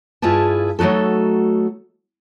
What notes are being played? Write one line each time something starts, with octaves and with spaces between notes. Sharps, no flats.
G2 E4 F4 G#4 B4 A5
F#3 A3 D#4 F#4 A4